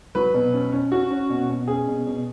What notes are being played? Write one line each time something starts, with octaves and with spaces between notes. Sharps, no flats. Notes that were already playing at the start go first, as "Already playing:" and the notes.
F#3 B4
B2
C#4
C#4
C#4 F#4
C#4
B2
B2
C#4 G#4
B2
B2